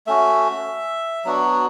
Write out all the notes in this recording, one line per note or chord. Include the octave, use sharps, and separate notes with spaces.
A3 C#4 F#4 E5
F#3 B3 D4 F#4